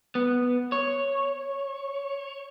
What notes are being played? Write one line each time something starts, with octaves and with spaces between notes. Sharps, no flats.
B3
C#5